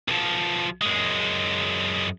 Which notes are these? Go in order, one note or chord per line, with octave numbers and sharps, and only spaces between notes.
B1 F3
F#2 G#3